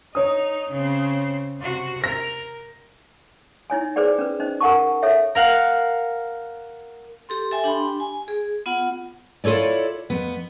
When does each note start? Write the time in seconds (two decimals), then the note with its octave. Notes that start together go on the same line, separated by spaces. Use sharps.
0.15 D#4 C#5 D#6
0.70 C#3 C4
1.60 C3 F#4
2.04 A#4 A#6
3.70 D#4 E4 C#5 G#5
3.96 G#4 B4 C5 D5 G5
4.19 C#4 B4
4.40 C#4 D#4 C5 D#5
4.61 A#4 F#5 G5 A5 C#6
5.02 A4 C#5 E5 G5
5.35 A#4 F5 F#5
7.29 G4 A4 C6
7.51 A4 E5 G5 G#5
7.64 D4 G4 G5 B5 C6
8.00 G#5
8.28 G#4
8.66 B3 F4 F#5
9.44 E4 F4 A4 C#5 D5
10.10 F2 B3